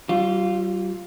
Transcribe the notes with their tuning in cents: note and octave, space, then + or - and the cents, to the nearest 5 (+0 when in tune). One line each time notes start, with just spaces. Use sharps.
G3 -40 F4 +0